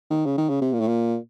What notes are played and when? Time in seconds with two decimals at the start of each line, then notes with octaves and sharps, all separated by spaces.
0.10 D#3
0.26 C#3
0.37 D#3
0.49 C#3
0.61 C3
0.73 A#2
0.80 A2
0.88 A#2